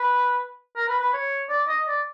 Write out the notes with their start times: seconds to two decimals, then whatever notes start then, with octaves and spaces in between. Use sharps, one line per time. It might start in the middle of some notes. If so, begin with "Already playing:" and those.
Already playing: B4
0.76 A#4
0.88 B4
1.00 B4
1.13 C#5
1.49 D5
1.68 D#5
1.87 D5